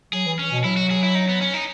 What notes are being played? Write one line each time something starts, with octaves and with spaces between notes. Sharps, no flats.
F#3 G#4
E3
C#4
B2
F#3 E4
F#4
G#4
E4
D#4
B3
C#4
D#4